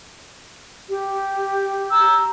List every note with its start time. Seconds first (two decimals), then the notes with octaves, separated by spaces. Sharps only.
0.89 G4
1.91 A#5 E6 G6